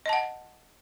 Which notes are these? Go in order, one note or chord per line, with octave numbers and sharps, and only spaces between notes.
D#5 F#5 A5